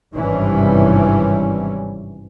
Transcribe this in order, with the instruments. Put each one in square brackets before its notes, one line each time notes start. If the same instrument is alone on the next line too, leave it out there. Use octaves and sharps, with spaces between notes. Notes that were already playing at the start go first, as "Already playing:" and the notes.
[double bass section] G#1 G2 C3 E3 G3 C#4